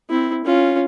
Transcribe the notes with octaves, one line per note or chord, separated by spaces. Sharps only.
C4 E4
C#4 F4